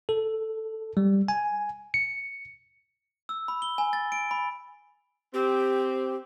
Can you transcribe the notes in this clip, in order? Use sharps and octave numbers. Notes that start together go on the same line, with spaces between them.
A4
G3
G#5
C#7
E6
B5
G7
G#5
A6
D7
B5
C4 G4